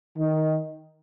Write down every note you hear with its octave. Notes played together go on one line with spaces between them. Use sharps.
D#3